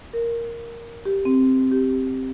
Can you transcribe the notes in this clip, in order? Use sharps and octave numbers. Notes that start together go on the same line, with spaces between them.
A#4
G4
C4
G4